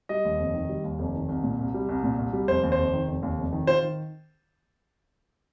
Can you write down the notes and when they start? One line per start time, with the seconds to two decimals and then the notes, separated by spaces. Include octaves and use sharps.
0.09 G3 D#5
0.25 D#2
0.39 F1
0.54 D#3
0.69 G3
0.84 D#2
0.99 F1
1.14 D#3
1.29 C2
1.43 A#2
1.59 C2
1.74 G3
1.89 C2
2.04 A#2
2.18 C2
2.33 G3
2.48 F1 C5
2.63 D#2
2.72 C5
2.78 F1
2.93 D#3
3.08 F1
3.23 D#2
3.38 F1
3.52 D#3
3.67 F4 C5
3.83 D#3